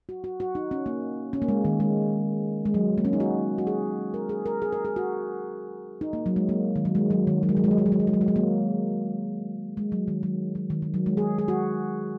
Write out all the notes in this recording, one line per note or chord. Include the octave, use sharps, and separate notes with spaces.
F#4
F#4
F#4
D#4
C#4
A#3
C#4
A#3
G#3
D#3
G#3
G#3
F#3
A#3
C#4
D#4
F#4
F#4
G#4
A#4
G#4
A#4
G#4
A#4
G#4
F#4
D#4
A#3
F#3
G#3
A#3
D#3
F#3
G#3
F#3
D#3
F#3
G#3
F#3
G#3
F#3
G#3
F#3
G#3
F#3
G#3
F#3
G#3
F#3
A#3
G#3
F#3
D#3
F#3
F#3
D#3
D#3
F#3
G#3
G#4
G#4
F#4